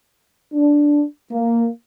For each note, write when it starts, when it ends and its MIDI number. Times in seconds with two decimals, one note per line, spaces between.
0.54 1.04 62
1.31 1.67 58